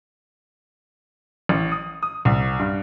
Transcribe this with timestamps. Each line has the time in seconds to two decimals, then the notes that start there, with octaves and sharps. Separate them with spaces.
1.49 A1
1.72 D#6
2.03 D#6
2.25 C2
2.59 G2